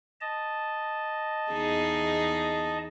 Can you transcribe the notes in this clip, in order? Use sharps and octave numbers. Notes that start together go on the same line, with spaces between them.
D#5 A5
E2 D#4 G#4